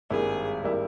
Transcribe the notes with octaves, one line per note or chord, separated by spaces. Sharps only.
G#1 G2 G3 A#3 E4 G#4
G#1 G3 A#3 E4